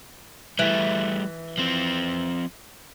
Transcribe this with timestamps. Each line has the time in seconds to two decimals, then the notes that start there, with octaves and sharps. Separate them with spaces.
0.59 E3 G3 A3
1.58 F3 C4